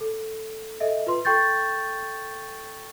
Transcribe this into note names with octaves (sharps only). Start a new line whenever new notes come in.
A4
A4 D#5 E5
F4 B4 C6
A4 G5 C#6 G6 A6